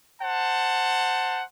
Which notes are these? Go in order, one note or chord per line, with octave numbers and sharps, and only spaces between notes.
C5 F#5 A5